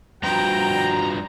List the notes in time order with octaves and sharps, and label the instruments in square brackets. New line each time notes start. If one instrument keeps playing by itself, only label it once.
[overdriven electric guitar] G2 F3 [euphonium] F#4 [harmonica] G5 [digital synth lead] A#5